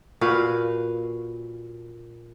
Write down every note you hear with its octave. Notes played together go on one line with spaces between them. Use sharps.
A#2 F#4 B4 F5